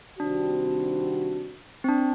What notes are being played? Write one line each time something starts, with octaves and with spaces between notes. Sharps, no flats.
C3 D#3 G3 C4 D4 F#4
C4
D4